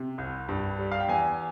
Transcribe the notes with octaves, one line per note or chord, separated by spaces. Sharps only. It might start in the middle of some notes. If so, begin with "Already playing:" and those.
Already playing: C3
C2
G2
G3
F5
G5
E2 G#5